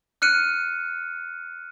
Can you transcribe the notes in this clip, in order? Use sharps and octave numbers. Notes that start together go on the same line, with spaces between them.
F6 F#6 C#7 D#7